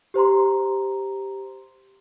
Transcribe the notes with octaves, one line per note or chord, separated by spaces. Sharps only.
G4 C5 A#5 C6